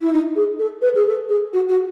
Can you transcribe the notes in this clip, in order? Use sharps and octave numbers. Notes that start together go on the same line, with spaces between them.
E4
D#4
G#4
A4
B4
G#4
A4
G#4
F#4
F#4